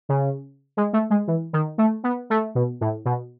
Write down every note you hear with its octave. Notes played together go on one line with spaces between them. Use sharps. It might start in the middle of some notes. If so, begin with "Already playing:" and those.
C#3
G#3
A3
G#3
E3
D#3
A3
B3
A3
B2
A2
B2